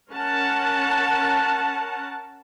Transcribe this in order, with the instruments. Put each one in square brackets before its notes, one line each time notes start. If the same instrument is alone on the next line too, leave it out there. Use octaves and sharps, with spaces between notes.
[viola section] C#4 A#4 F#5 A5